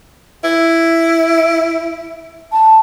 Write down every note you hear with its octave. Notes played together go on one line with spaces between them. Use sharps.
E4
A5